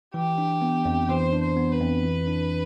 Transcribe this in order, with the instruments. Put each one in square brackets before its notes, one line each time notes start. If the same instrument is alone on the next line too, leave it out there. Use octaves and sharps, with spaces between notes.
[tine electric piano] E3 [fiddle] G4
[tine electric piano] D4
B3
F2
[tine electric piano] E3 [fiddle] C5
[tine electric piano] D4
[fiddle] C5
[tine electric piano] B3
[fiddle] B4
[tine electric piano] F2
E3
D4